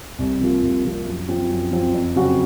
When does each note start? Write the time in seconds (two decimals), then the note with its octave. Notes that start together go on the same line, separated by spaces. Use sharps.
0.19 C2
0.40 C3 F3 A#3 F4
0.63 C2
0.84 C3 F3 A#3 F4
1.06 F#2
1.28 F3 C4 F4
1.50 F#2
1.72 F3 C4 F4
1.94 F2
2.15 C#3 F#3 C4 F#4